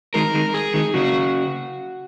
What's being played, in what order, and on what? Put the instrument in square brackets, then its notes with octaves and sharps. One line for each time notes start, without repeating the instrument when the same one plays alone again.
[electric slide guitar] D#3 G#3 [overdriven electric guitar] A#4
[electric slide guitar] D#3 G#3
[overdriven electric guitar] G#4
[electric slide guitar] D#3 G#3
[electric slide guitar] C#3 F#3 [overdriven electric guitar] F#4